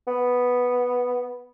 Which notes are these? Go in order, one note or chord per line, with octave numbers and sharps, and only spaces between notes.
B3